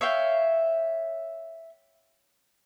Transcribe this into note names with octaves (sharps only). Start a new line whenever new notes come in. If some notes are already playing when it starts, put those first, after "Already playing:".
C#5 E5 F5 G5